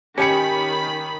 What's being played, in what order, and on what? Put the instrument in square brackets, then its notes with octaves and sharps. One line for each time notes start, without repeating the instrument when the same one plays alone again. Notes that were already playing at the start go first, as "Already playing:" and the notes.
[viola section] D#3 B5 [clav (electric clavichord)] C#4 [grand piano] G4 G#5 C#7